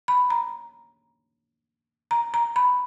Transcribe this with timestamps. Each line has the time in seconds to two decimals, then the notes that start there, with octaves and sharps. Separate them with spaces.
0.08 B5
0.30 A#5
2.11 A#5
2.34 A#5
2.56 B5